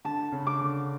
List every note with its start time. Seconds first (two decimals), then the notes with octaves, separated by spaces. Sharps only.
0.05 D3 A5
0.32 C#3
0.47 D6
0.61 D3